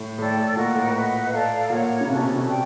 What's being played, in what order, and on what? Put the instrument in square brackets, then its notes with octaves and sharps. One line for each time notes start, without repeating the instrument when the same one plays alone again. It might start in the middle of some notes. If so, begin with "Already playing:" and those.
Already playing: [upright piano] A2
[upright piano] A2 [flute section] A4 D5 G5
[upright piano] A2
[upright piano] A#2 [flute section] F#4 A#4 D#5 F#5
[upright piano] A2
[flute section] B4 D#5 F#5
A4 D5 F5 A#5
[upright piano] A#2 [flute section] A#4 C#5 F#5 A#5
[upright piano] C#3
[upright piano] C3 [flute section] C#4 F#4 A4
[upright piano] B2
C3
B2
[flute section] A4 D5 G5